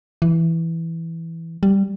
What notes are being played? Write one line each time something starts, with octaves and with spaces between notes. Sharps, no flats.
E3
G3